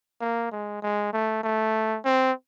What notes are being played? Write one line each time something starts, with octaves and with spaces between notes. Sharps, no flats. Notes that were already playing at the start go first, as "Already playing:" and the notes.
A#3
G#3
G#3
A3
A3
C4